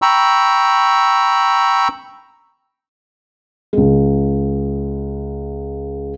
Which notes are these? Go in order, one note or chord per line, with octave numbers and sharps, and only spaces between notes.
G5 A#5 B5 C#6 E6
C#2 G#3